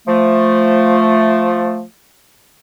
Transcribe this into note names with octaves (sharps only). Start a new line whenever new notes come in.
F3 A3